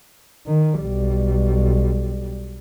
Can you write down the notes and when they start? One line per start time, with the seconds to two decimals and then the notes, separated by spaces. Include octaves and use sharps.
0.47 D#3
0.82 B1 G3